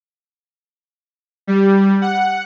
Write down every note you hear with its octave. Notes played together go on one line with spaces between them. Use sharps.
G3
F#5